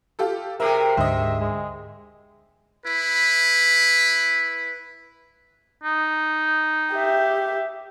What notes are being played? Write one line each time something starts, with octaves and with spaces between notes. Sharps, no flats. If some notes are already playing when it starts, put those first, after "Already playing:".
F4 G4 A4
C3 G4 G#4 A#4 E5
D2 G#2 D3 C5 D#5 E5
G#3
E4 B4
D#4
G4 E5